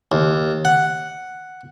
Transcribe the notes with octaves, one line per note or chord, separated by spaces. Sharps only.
D#2
F#5